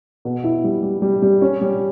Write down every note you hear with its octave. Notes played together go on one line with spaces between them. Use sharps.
B2
E4
G3
G3
G3
G3
C#4
G3